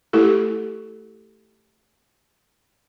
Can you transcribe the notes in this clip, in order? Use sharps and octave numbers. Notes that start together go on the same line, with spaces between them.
A3 E4 G4 A4